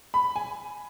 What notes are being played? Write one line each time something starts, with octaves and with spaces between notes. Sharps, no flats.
B5
G#5